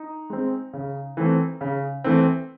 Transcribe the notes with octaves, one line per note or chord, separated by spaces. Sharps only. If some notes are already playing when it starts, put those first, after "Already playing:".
Already playing: D#4
G#3 C4
C#3
E3 A3 C4
C#3
E3 A3 C4